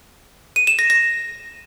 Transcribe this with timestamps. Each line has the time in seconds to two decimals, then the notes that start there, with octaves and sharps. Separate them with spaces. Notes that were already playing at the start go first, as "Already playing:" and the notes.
0.56 D#7
0.67 E7
0.79 A#6
0.90 A#6